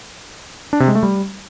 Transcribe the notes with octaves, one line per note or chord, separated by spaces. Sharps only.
D4
C3
G#3
A3
G3